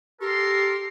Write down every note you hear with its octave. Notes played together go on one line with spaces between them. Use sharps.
G4 A4 A#4 C6